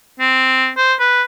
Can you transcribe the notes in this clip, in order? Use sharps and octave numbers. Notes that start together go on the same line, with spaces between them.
C4
C5
B4